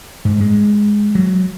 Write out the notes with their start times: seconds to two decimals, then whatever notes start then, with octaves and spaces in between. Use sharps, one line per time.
0.25 G#2
0.41 G#3
1.15 F#3